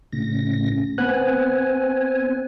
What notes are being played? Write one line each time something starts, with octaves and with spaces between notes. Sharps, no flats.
A2 C#3 A#6
B3 C4 G#5 F#6